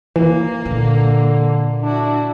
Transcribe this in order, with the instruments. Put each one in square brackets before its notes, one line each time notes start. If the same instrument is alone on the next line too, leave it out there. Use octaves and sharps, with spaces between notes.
[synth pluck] E3 [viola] A#3
[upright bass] A#2 [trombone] D3
[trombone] D4 [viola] E4 F#4